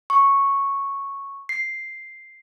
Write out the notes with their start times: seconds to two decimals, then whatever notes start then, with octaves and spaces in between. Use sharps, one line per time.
0.10 C#6
1.49 C7